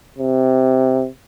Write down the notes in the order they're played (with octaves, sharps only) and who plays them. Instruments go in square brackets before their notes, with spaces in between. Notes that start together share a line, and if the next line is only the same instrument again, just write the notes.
[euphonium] C3